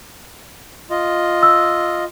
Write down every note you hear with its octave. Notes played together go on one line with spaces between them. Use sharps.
F4 D#5
E6